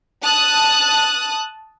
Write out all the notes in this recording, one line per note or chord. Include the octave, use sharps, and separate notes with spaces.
A5 D#6 F#6